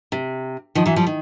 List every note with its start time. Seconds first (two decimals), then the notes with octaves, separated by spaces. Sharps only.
0.12 C3
0.75 D#3 F3
0.86 E3 F#3
0.96 F3 G3
1.07 D#3